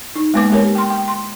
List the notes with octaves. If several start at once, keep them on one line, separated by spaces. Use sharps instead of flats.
D#4
G#3 A#3 B3 B4 D6
G#3 B3 G4 A#4 C#5
G5 C6
G5
C6